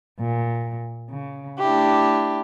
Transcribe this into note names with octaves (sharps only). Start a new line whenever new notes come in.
A#2
C#3
A3 D4 E4 G4